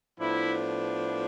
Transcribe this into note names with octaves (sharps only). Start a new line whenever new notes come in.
A2 F3 B3 D4 E4